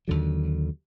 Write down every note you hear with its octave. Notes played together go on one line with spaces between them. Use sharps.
D#2 D3 F#3